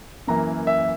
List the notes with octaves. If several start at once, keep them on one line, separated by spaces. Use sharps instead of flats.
F#2 E3 A#3 A#5
E5